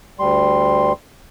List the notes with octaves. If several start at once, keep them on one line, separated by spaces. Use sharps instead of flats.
D2 G3 C6